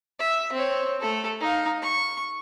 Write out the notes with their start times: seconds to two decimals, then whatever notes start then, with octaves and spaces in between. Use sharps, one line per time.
0.19 E5
0.53 C4 C#5
1.01 A3 A4
1.41 D#4 F5
1.82 C#6